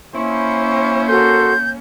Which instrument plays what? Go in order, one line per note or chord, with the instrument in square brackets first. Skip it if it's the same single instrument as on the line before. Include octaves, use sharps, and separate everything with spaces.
[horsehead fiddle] A#3 C#4 [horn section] E4 C5 [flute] C#6
[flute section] F#4 A4 [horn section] A#4 C5 C6 [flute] G6